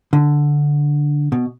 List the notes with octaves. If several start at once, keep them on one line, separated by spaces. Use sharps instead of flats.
D3
B2